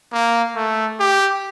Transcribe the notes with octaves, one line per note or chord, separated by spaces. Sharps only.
A#3
A3
G4